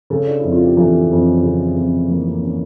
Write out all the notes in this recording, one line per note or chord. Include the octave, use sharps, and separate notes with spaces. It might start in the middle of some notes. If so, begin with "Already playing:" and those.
C#3 A4
D4
F2 E4
F4
G4
E3 A4
F2
C#3
F2
E3 A#3
A#3
C#4